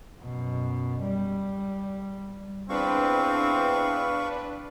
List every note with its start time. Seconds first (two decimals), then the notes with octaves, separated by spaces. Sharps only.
0.22 F#2 B2
1.02 G3
2.70 E2 C4 D4 B4 F5 C#6